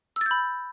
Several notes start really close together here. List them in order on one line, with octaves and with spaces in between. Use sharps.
E6 A6 G6 B5